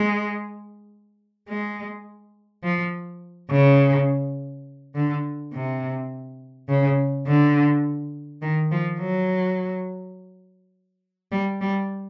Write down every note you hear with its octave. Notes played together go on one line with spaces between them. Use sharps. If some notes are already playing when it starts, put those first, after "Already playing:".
Already playing: G#3
G#3
F3
C#3
D3
C3
C#3
D3
D#3
F3
F#3
G3
G3